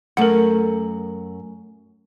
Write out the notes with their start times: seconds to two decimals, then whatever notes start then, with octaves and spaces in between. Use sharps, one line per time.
0.17 F#2 A3 A#4 F#5